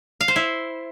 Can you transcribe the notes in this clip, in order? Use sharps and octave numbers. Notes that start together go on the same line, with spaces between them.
F5
C5
E4